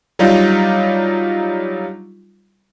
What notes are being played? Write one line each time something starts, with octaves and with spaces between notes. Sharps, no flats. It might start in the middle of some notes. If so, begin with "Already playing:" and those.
F#3 G3 D4 D#4 F4